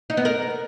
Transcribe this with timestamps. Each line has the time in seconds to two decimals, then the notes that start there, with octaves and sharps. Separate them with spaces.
0.10 D#4
0.17 B3
0.25 A#4